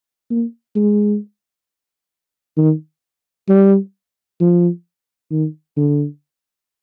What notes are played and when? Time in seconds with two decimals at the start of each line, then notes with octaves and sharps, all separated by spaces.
0.30 A#3
0.76 G#3
2.58 D#3
3.49 G3
4.40 F3
5.31 D#3
5.77 D3